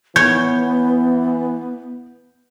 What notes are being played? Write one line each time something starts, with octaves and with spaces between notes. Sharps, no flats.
E3 B3 C#5 G6